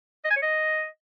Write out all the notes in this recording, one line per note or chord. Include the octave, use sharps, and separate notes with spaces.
D#5
G#5
C#5
D#5